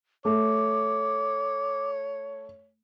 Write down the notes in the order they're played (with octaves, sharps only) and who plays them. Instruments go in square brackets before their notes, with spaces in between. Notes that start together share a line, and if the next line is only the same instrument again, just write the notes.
[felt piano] A3 [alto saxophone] C#5 [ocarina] D6